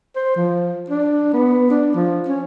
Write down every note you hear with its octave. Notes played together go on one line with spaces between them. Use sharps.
C5
F3
D4
B3
D4
F3
C#4